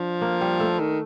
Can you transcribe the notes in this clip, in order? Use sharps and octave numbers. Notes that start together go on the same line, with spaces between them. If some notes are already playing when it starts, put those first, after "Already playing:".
Already playing: F3 D4
A#3
G3
A3
D#3